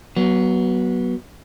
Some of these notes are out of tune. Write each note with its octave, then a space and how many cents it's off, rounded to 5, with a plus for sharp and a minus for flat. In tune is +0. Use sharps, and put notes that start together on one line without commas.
F#3 +15 B3 -20